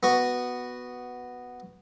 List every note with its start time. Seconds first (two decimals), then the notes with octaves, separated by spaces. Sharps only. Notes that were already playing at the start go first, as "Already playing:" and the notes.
0.03 B3 F#4